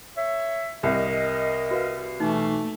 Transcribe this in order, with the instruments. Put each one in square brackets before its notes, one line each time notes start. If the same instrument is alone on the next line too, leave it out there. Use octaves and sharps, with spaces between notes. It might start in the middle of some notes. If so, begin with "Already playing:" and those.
[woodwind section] C#5 E5
[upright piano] C2 [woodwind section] A#4 D#5
[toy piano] F#4 B4 F5
[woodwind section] B2 E3 [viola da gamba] A3 [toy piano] D#4